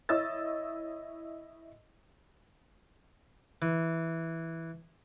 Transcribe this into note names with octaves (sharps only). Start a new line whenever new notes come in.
E4 C#5 D#5 E6 A6
E3